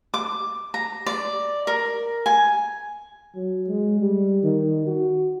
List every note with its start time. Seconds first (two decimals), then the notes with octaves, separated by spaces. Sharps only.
0.14 D6
0.74 A#5
1.06 D5
1.67 A#4
2.26 G#5
3.35 F#3
3.67 G#3
4.00 G3
4.43 D#3
4.86 F#4